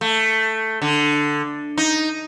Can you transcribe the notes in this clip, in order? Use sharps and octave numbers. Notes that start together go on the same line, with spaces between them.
A3
D3
D#4